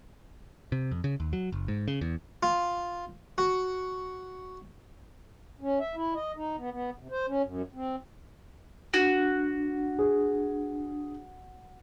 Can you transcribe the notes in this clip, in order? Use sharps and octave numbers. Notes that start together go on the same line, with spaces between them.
C3
F2
C#3
D#2
F#3
F#1
G#2
C#3
E2
F4
F#4
C#4
E5
E4
D#5
D#4
B3
B3
C3
C5
C#4
F#2
C4
D4 F#4
G#4